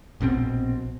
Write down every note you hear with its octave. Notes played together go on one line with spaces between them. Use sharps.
A#1 B2 D3 C4